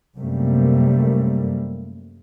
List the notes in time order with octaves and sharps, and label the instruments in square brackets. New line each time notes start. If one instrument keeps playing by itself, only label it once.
[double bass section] F#2 C3 G3 A3 A#3